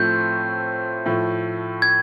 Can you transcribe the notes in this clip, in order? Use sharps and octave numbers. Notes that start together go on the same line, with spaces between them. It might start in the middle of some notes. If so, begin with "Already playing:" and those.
Already playing: A2 F3 A3 C4 G6
A2 F3 A3
G#6